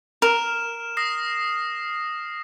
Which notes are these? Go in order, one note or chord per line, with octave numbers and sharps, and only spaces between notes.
A#4 F6 E7
D#6 A#6 C7